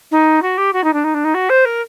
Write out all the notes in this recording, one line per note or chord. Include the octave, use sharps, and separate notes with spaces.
D#4
F#4
G4
F#4
D#4
D4
D#4
D4
D#4
F#4
C5
A#4